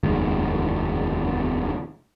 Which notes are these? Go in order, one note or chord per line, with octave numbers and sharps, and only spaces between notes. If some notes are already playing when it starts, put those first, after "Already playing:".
F1 D#2 G#2